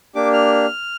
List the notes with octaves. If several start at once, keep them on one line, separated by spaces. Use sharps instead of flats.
A#3 D4 G4 D6
F6